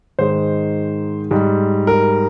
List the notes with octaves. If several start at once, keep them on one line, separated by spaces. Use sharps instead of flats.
G#2 D#3 G#3 C5
G#2 G3
A#4